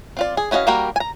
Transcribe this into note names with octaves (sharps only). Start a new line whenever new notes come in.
C4 F4 D5
G#4
E3 C#4 F#4 D#5 F5
G3 A#3 F#4 A#4 G5
G#5 A#5